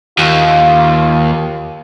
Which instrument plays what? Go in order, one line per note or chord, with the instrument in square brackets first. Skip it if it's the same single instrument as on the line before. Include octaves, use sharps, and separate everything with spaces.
[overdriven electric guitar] D#2 [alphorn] F4